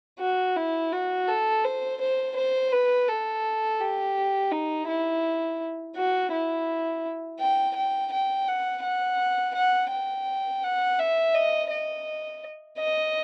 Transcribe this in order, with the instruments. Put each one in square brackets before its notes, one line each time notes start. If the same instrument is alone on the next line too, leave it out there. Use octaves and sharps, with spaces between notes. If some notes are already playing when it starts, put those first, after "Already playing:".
[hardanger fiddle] F#4
E4
F#4
A4
C5
C5
C5
B4
A4
G4
D#4
E4
F#4
E4
G5
G5
G5
F#5
F#5
F#5
G5
F#5
E5
D#5
D#5
D#5